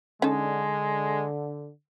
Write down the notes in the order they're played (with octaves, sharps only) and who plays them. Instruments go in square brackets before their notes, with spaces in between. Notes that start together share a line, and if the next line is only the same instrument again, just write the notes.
[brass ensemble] D3 [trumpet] G#3 [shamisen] C#4 D#4 A4